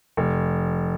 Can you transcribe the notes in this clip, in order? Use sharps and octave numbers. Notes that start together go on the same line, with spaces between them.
F1